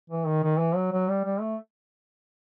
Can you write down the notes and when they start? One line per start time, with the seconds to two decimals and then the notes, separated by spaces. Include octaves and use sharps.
0.10 E3
0.27 D#3
0.43 D#3
0.59 E3
0.75 F#3
0.92 F#3
1.08 G3
1.24 G3
1.41 A3